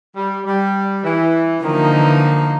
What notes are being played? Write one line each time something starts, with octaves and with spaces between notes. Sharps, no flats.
G3
G3
E3
D3 D#3 F3 A#3 D#4
E3